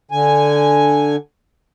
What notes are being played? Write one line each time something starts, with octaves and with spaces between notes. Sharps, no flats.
D3 G#5